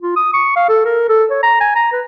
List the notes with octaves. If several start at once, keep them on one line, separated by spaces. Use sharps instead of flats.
F4
D#6
C#6
F5
A4
A#4
A4
C#5
A#5
G#5
A#5
B4